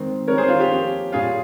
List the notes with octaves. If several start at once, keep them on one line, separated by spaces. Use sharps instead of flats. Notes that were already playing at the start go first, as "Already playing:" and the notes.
Already playing: D#3 G#3 C4
D#3 G3 C4 A#4 C#5
G#4 C5
F4
G4
F3 A#3 C#4
A#2 G3 C#4 F4 G#4